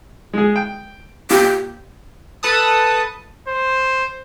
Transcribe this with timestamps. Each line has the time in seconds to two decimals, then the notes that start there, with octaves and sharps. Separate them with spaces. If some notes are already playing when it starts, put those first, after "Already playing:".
0.33 G#3 G#4
0.56 G5
1.30 A#2 G4
2.43 A4 B4 A5 D#6
3.48 C5